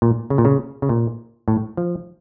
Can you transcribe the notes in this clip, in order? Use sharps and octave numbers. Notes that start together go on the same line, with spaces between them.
A#2
C#3
A#2
C#3
C#3
A#2
A2
F3